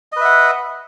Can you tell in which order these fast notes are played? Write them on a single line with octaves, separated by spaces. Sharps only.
D#5 B4 E5 F#5